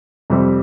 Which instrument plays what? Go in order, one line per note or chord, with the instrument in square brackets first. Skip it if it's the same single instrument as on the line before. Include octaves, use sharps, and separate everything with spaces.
[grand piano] F2 C3 G3 C4 G4